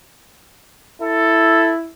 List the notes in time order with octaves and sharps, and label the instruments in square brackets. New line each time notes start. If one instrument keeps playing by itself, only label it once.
[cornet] E4 [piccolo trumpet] A4